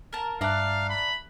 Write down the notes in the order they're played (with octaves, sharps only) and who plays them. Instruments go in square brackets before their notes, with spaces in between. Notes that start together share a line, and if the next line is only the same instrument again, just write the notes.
[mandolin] A#4 A5
[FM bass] G2 [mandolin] D5 A#5 [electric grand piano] E5 A5 F#6 [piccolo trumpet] F5
[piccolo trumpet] B5